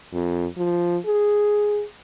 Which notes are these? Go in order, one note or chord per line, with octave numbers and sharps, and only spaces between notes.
F2
F3
G#4